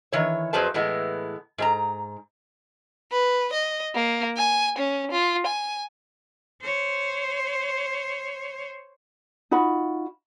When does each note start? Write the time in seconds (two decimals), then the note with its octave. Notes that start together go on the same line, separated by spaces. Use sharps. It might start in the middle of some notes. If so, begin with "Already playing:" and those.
0.13 D#3 E3 C#5
0.53 F2 F#3 G#4 B4 C5 A5
0.74 A2 E3 G#3 B3
1.58 G#2 G#4 A#5
3.12 B4
3.53 D#5
3.95 A#3
4.37 G#5
4.78 C#4
5.11 F4
5.46 G#5
6.61 C5 C#5
9.51 D#4 F4 F#4 B5